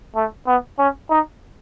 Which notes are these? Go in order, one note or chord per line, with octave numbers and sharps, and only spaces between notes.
A3
B3
C#4
D#4